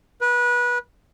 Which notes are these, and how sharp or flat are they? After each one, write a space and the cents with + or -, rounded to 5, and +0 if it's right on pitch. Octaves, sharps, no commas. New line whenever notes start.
B4 -25